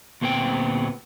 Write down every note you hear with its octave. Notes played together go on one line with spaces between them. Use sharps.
D2 A#2 B3 C4 G5